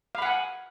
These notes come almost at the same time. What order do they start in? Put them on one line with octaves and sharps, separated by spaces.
F5 B5 F#5 G#5